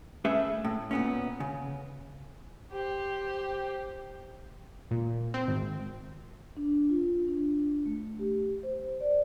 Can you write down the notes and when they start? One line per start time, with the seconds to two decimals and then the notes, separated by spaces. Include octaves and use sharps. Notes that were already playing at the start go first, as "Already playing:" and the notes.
0.25 A3 C#4 G#4 B4 E5
0.64 A2
0.91 A#2 B3 C#4
1.40 C#3
2.72 G4 C5
4.91 A#2
5.34 C4
5.48 G#1
6.57 D4
6.89 F4
7.28 D4
7.86 A3
8.19 G4
8.63 C5
9.00 D5